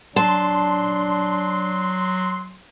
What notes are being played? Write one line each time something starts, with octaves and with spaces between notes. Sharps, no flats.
F#3 D4 A5 C6